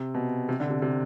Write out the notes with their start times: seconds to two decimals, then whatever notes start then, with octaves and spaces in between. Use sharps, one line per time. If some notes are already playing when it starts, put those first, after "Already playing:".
Already playing: C3
0.14 B2
0.49 C3
0.60 D3
0.70 C3
0.82 C3